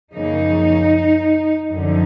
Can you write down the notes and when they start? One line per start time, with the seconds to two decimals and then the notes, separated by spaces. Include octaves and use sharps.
0.13 F#2 C#3 F3 A#3 D#4
1.72 F#2 D3 F3 D#4